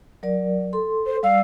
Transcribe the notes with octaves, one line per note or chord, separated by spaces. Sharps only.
F#3 A#4 D5
A4 C6
C5
G3 D5 F5 E6